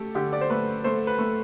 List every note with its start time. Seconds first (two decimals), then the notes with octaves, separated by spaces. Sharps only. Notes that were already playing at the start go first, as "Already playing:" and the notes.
Already playing: A3 G4 A4
0.15 D3 G4
0.33 D5
0.41 C5
0.50 A3 B4
0.84 A3 C5
1.07 B4
1.19 A3